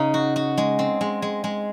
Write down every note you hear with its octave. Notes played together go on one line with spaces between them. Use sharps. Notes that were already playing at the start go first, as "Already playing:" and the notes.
Already playing: C#3 D#4
F#4
F#4
G#3
C4
G#3
G#3
G#3